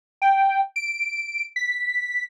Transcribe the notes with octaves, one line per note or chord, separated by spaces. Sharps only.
G5
D7
B6